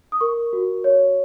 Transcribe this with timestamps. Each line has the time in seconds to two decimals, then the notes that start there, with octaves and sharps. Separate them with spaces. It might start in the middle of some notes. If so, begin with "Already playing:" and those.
0.12 D#6
0.21 A#4 C#6
0.53 F#4
0.84 C#5